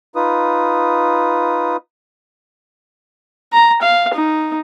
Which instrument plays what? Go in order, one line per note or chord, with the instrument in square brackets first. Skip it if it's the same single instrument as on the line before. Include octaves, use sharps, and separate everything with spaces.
[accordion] D#4 F4 B4 D#6
[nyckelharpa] A#5
F5
D#4